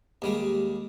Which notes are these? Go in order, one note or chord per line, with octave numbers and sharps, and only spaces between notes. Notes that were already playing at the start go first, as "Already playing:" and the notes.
D#2 G3 G#3